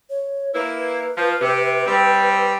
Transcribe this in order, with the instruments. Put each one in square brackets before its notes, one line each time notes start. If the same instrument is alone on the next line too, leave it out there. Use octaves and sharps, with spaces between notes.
[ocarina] C#5
[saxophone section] A#3 E4 [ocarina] B4
[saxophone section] F3
C3
G3 C4